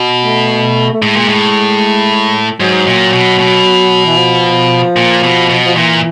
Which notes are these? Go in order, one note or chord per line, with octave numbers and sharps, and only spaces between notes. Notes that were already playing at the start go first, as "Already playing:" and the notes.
Already playing: B2
A3
A3
A2 G#3
A#2
A2
G#2 F#3
A#2
B2
B2
E3
F3
A#2
B2
B2
F3
A#2 E3